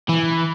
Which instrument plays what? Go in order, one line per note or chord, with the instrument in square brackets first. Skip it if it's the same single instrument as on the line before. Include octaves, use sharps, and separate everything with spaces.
[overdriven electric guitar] E3